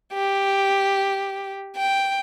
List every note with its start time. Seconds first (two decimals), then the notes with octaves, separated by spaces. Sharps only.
0.14 G4
1.76 G5